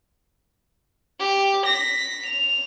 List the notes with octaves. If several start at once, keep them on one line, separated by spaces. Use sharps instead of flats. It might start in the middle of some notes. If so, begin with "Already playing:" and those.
G4
A#6 B6
F7